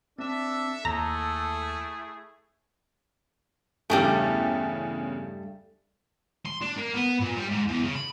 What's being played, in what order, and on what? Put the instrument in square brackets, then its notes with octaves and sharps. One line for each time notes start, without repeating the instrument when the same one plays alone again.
[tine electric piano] C4 [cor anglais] D4 [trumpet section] A4 E5
[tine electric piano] D#2 [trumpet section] A3 E4 G#4 [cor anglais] A4 [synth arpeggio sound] A#5
[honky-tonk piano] E2 C#3 [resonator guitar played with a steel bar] G2 G3 A3
[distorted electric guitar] C6
D4
A#3
B3
A#2
G3
G#2
E2
C#3
B5